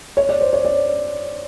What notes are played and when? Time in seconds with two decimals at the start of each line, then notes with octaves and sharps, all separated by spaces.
0.17 C#5
0.29 D5
0.41 C5
0.53 C#5
0.65 D5